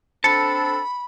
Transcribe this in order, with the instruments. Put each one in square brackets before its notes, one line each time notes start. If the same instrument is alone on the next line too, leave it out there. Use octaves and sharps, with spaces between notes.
[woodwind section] C4 D4 A4 [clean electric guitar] A5 [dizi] B5 [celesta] C#7